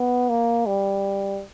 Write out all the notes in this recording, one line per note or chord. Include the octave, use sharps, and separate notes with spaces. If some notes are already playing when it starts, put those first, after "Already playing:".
Already playing: B3
A#3
G3